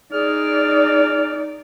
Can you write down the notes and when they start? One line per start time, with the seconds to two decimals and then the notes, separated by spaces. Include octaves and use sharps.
0.13 D#4 G#4 D5 F6